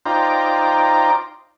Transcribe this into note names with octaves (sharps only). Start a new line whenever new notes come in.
D#4 F4 C5 D5 G5 A#5